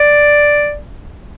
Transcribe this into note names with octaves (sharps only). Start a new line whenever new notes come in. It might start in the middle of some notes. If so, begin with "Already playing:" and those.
Already playing: D5